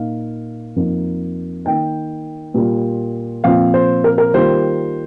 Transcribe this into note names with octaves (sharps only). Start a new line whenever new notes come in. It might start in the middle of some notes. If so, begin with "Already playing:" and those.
Already playing: A#2 A#3 D#4 F5
F2 F3 A#3 D#4
D#3 A#3 D#4 G5
A#2 G3 A#3 F4
A#2 F3 C4 F4 F5
C5
A#4
A#4
D#3 G3 A#3 F4 C5